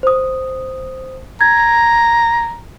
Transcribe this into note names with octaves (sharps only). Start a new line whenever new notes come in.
C5 D#6
A#5 G#6